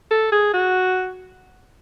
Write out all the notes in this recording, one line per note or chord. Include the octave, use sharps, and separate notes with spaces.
A4
G#4
F#4